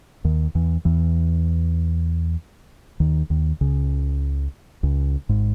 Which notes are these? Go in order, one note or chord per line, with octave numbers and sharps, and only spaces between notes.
D#2 D#3
E2 E3
E2 E3
D#2 D#3
D#2 D#3
C#2 C#3
C#2 C#3
G#1 G#2